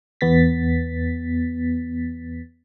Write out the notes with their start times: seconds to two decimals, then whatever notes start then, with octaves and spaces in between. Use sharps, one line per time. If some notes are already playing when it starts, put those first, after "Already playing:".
0.21 E2 B3 A6 B6